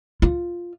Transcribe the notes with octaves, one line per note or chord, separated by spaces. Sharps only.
F4